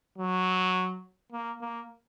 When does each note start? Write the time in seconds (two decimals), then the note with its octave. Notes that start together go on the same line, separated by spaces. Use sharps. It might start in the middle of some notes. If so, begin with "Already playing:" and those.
0.18 F#3
1.32 A#3
1.61 A#3